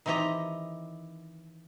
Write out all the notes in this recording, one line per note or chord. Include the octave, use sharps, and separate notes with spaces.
D#3 E3 C4 G4 D#5 A#5